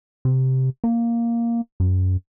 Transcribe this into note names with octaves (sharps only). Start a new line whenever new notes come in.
C3
A#3
F#2